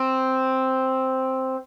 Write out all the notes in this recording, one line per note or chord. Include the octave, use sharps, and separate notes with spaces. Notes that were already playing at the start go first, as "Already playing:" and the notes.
Already playing: C4